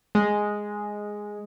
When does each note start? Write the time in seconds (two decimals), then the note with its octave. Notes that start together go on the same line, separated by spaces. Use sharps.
0.15 G#3